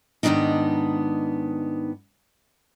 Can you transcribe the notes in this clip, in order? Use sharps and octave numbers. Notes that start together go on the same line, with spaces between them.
G#2 D#3 E3 B3 D4 D#4